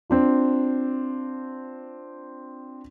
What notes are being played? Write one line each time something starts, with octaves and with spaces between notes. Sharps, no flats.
C4 D4 F4